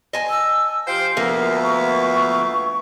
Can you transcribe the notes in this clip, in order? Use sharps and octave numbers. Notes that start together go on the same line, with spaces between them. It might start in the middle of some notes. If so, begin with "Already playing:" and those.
D#5 G#5 A5
E6
F3 G4 C5 F5 G5
D2 F3 A#3 B3 A4 A#4 E5 F5
C#6